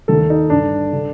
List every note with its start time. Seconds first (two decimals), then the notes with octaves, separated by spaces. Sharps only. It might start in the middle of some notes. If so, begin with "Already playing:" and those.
0.08 D#2 D#3 A4
0.30 D#4
0.50 G2 D3 D4
0.93 D3